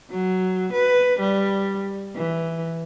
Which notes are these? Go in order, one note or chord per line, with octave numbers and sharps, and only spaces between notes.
F#3
B4
G3
E3